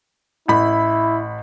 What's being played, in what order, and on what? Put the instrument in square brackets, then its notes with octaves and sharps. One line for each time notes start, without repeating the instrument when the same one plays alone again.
[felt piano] A1 B5 [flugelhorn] E4